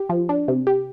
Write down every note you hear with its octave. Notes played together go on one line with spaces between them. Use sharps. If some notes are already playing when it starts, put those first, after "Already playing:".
Already playing: G4
F3
D4
C3
G4